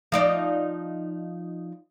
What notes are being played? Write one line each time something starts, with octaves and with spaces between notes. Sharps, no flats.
F3 D#4 D5